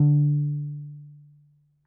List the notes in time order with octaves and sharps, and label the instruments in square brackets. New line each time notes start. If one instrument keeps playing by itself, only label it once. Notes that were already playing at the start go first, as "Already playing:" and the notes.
Already playing: [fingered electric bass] D3